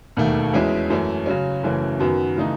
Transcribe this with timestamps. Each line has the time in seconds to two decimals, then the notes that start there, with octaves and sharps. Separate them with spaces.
0.17 E1 D#2 D#3 A3
0.53 E2 B2 G#3 C#4 E4
0.90 F#2 E3 A3 C#4
1.26 C#3 F#3 C#4
1.63 F#1 F#2 E3 A3 C#4
1.99 F#2 D#3 F#3 B3 F#4
2.37 C#3 E3 A3 D#4